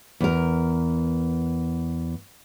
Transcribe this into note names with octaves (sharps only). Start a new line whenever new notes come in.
E2 A#4